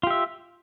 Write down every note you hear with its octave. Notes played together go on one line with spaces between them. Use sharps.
F4 G4 E5